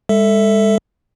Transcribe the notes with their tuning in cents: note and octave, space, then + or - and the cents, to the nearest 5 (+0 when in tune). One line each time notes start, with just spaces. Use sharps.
G#3 -35 A4 +10 E5 +0